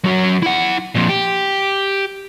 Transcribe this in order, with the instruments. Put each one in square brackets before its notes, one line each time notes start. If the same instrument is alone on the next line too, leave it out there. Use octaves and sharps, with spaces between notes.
[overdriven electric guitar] F#2 F#3
E4 F#5
F2 A#2
G4